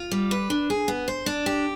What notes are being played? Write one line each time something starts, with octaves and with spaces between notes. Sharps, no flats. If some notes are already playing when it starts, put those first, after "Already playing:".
Already playing: F4
G3
B4
D4
G#4
B3
C5
D4
G4